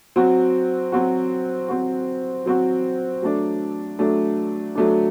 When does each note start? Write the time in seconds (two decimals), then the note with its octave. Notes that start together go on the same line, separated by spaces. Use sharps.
0.16 F#3 C4 F#4
0.92 F#3 C4 F#4
1.68 F#3 C4 F#4
2.46 F#3 C4 F#4
3.22 F#3 A3 D4
3.99 F#3 A3 D4
4.75 F#3 A3 D4